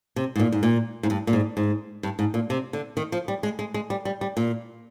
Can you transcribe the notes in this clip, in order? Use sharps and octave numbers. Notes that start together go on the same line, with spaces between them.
C3
G#2
A#2
G#2
A#2
G#2
G2
A#2
G#2
G#2
G2
G#2
A#2
C3
D3
D#3
F3
G3
G#3
G#3
G#3
G3
G3
G3
A#2